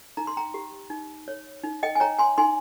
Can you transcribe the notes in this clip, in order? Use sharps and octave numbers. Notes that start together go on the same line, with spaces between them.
D#4 A#5
C6
G5 A#5
G4
D#4
C#5
D#4
D#5 G5
G#5
C#5 G5 A#5
G#5 C6
D#4 G#5 C6